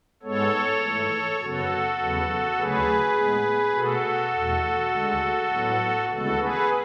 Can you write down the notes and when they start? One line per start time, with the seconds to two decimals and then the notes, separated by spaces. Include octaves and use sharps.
0.23 G#2 G#3 B3 A4 C#5
0.81 G#2 E3 A3
1.40 F#2 C#3 F#3 B3 F#4 A4
1.99 E2 C#3 F#3 B3
2.57 D2 C#3 F#3 A3 G#4 B4
3.16 A2 G#3 B3
3.74 B2 A3 F#4 A4
4.33 E2 B2 A3
4.92 D2 D3 G#3
5.51 A2 F#3 B3
6.09 D2 C#3 E3 G#3 B3 F#4 A4
6.38 G#4 B4